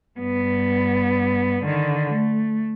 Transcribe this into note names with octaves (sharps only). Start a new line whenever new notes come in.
G2 B3
D3 D#3
A3